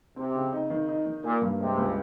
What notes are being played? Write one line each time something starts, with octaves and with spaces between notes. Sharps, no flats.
C3 C4
C#3
D#4
D#3
D#4
D#3
A#2 A#3
G2
C3 G#3
C#2